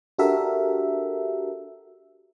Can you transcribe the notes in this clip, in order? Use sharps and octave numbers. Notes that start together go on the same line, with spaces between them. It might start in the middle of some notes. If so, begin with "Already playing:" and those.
D4 F#4 G4 A4 A#4 E5